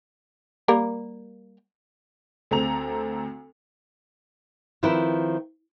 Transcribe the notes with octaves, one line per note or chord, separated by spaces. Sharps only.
G3 A#3 A#4
D2 C4 A4 A#5 F7
D#3 F3 C4 E4 B4